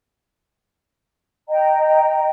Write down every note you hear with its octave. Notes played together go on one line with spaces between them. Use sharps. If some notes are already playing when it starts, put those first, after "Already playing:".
D#5 G5 A#5